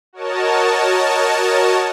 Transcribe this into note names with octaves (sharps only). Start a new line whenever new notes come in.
F#4 A#4 C#5 D#5 A5